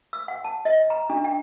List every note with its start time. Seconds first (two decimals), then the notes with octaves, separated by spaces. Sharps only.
0.13 E6
0.28 F#5
0.44 A5
0.65 D#5
0.90 A#5
1.10 D4
1.24 G5